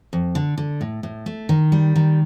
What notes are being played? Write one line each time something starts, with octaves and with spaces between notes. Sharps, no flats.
F2
D3
D3
A2
A2
A3
D#3
G3
D#3